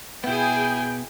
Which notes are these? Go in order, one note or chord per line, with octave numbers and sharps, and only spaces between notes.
B2 B3 E4 G#4 G5 G#5